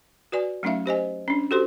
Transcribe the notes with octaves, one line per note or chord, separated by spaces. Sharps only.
F#4 B4 D5 G#5
F#3 A3 C#4 D#4 E5 F5
G4 C5 D#5 G#5
C#4 D4
F#4 G4 A4 C5 C6